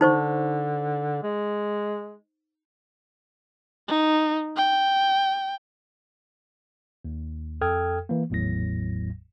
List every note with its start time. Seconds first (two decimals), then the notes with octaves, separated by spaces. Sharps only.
0.01 D3 D#4 C5 C#6
1.23 G#3
3.88 D#4
4.57 G5
7.05 D#2
7.61 F2 A4 G5 D#6 F6 G#6
8.09 E3 A#3
8.30 G#1 E2 A2 F#3 A#6